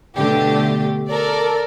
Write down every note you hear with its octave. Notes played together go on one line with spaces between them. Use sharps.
B2 D3 A3 G4
A4 A#4 D5